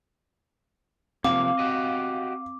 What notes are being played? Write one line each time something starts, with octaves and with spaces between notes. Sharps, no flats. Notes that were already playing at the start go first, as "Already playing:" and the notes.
C3 F3 A#3 C4 F5 D6
F#4 G4 D#5